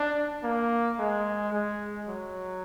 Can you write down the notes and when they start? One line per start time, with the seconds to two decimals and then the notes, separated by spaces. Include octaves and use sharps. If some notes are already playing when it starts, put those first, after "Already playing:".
Already playing: D4
0.43 A#3
0.98 G#3
1.53 G#3
2.08 F#3